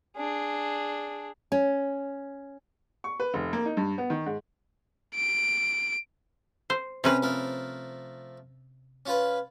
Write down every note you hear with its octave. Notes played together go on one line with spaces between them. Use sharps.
D4 G#4
C#4
C#6
B4
F1
A#3
D#4
G2
B3
D#3
G#2
D7
C5
C3 C#4 B4 C5 G5 A#5
F3 A3 A#4
C#4 F4 B4